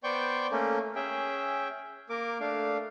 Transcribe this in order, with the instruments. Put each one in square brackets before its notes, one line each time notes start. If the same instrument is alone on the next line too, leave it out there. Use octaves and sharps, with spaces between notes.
[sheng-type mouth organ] B3 C5 D5 G5 C#6 G6
A3 A#3 C#4
C#4 G#4 E5 G5
A#3 A#4 D6
A3 D4 F5